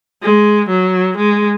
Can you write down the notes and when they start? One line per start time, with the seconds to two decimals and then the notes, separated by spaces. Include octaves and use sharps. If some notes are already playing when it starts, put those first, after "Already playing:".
0.23 G#3
0.69 F#3
1.17 G#3